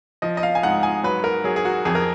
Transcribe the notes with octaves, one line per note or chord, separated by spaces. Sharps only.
F3 D#5
D#5
F5
G#5
G#2 F#5
G#5
F#3 B4
A#4
F#3 G#4
G#4
F#4
F2 G#4
A#4